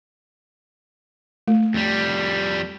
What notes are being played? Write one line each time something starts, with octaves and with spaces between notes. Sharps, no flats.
A3
F2 G3